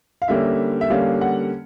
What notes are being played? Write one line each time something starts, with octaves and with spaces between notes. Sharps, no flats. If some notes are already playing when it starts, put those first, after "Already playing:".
F5
D3 G3 A#3 C#4 E5
E5
D3 G3 A#3 C#4 F5
F#5